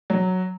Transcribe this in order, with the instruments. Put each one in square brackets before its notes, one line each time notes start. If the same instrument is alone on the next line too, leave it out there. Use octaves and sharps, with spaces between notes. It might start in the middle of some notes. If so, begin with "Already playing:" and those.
[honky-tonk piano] F#3